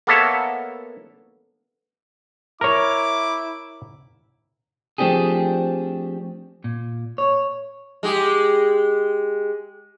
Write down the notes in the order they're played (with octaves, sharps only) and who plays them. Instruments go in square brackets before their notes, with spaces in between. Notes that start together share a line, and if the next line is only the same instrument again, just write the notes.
[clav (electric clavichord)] A#3 B3 A4 C#5 E5
[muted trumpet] E4 [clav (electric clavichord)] A#4 C#5 [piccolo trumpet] D6
[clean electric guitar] F3 A3 C4 D4 G4 G#4
A#2
C#5
[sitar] G#3 G4